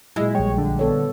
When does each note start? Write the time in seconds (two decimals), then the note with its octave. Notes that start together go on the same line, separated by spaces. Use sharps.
0.16 A#2 F#3 G#3 E4 G#4
0.35 A#1 G3 C#5 G5
0.58 D3
0.79 B3 A4 C#5